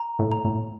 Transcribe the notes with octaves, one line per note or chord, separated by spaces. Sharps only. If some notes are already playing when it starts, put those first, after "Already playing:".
Already playing: A#5
A2
A#5
A2